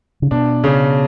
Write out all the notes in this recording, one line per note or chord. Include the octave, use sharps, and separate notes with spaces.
C#3
B2 D4
C#3